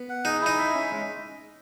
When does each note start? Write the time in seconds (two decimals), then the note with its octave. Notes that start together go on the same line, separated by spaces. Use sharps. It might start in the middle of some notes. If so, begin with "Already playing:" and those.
Already playing: B3
0.09 F#5
0.25 D#4 G#4
0.41 D#4 E4
0.58 E5
0.74 C#4
0.91 G#3